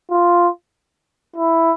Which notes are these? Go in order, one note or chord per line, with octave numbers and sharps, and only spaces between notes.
F4
E4